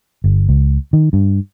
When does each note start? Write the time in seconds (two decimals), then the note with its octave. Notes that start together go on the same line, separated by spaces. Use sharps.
0.24 G1
0.49 C#2
0.93 D#3
1.13 G2